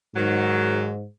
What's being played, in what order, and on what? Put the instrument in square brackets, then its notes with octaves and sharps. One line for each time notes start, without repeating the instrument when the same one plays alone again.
[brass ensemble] G#2 [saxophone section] D#3 F#3